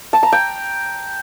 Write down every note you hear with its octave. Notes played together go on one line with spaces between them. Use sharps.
A5
A#5
G5